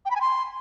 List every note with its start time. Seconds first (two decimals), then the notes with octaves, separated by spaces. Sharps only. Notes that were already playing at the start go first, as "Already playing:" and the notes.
0.05 G5
0.11 B5
0.16 G#5
0.21 C6